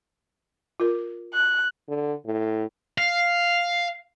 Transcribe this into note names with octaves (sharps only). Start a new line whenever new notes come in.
F4 A#4
F#6
D3
A2
F5